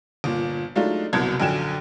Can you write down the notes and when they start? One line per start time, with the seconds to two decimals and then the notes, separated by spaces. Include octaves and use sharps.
0.24 G1 A#2
0.75 F#3 G#3 A3 D4 D#4 F4
1.13 F#1 C2 F#2 B2 A5 G#6
1.40 A#1 F#2 D3 G5 G#5 E7